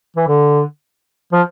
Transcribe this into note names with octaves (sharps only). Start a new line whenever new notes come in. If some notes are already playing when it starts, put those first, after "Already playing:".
E3
D3
F3